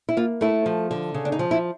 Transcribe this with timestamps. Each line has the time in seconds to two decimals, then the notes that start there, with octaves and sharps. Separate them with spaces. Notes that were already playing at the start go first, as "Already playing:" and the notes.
0.09 E4
0.17 A#3 F4
0.41 A3 E4
0.66 F3
0.91 D3
1.14 C#3
1.25 D4
1.32 D#4
1.39 F3
1.51 E4